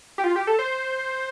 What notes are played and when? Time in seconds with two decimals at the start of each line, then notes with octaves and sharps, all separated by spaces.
0.18 G4
0.24 F4
0.36 G4
0.47 A4
0.59 C5